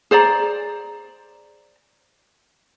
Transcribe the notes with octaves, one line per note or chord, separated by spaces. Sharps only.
G#4 C5 D5 A#5